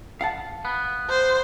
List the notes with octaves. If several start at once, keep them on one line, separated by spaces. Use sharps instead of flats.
F5 F#5 A5
B3
C5